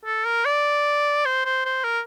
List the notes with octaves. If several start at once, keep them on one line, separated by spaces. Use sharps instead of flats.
A4
A#4
D5
C5
C5
C5
A#4